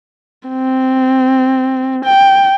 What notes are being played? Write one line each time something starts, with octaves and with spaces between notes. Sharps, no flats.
C4
G5